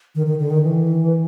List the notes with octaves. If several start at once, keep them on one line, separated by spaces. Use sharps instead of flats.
D#3
D#3
D3
D#3
E3